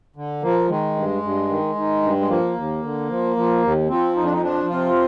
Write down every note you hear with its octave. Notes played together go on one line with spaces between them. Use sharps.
D3
F3 A#3
D#3 G#3
G2
G2
D#3
D#3
G2
G#3
F3 A#3
D#2
D3
F3
F3
D#2
F3 C4
F2 D#4
D4
D#4
F3 D4
C3 F4